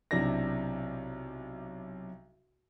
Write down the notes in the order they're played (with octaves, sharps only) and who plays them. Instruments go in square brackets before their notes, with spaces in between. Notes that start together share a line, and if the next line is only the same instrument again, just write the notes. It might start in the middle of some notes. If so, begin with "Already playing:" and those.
[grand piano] B1 C3 D4 E4 A#6